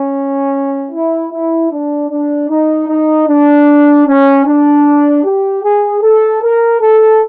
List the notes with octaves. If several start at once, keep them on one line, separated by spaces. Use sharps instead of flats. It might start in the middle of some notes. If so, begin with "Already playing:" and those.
Already playing: C#4
E4
E4
D4
D4
D#4
D#4
D4
C#4
D4
G4
G#4
A4
A#4
A4